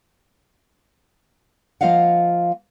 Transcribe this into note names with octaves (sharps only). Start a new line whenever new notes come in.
F3 A#3 F4 D#5 F5 F#5